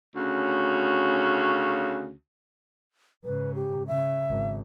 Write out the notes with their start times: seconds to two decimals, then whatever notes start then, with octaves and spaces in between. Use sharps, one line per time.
0.15 D2 C#3 C#4 F#4
3.24 G#2 C#3 B4
3.55 G4
3.87 C#3 E5
4.30 G#1